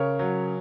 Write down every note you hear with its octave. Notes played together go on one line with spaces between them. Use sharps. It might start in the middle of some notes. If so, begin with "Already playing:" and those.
Already playing: C#3 A#4 C#5
F#3